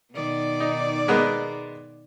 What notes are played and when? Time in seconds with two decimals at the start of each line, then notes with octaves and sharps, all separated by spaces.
0.12 B2 D#3 D5
0.60 D#4
1.08 G#3 A#3 B3